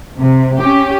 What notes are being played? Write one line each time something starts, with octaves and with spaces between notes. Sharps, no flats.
C3
C#4 G4